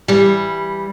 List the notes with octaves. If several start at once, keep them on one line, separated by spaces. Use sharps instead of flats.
E3 G3